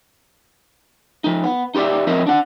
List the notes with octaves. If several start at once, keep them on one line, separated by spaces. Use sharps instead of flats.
F3 D#4
B3
D#4 G4 A#4 D5 E5
F3 C4 A#4 D#5 E5
D4 F#5